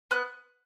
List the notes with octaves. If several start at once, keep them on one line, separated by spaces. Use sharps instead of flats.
B3 F#6